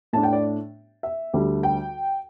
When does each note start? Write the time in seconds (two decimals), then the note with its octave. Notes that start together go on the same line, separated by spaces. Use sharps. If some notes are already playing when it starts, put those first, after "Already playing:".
0.13 A2 A3 D4 A5
0.23 G5
0.33 D5
1.03 E5
1.34 D2 D3 G3
1.63 G5